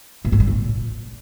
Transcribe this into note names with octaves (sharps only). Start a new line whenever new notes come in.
A#2
G#2
G3
A#2